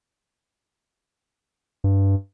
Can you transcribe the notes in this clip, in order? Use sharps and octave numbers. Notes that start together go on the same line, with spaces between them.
G2